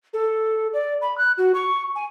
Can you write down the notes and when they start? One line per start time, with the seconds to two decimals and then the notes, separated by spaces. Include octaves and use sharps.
0.14 A4
0.73 D5
1.02 B5
1.18 F#6
1.38 F#4
1.55 C#6
1.96 G#5